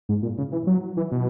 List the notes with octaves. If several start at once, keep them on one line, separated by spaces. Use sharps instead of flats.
G#2
A#2
C#3
E3
F#3
E3
B2